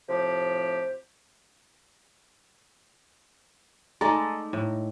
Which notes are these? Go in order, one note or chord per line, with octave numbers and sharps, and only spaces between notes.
A2 C3 F3 G4
G#3 A3 D#4 A4 D5 A#5
A2